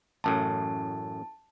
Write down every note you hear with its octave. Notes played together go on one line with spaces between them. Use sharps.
A1 F#2 A2 A5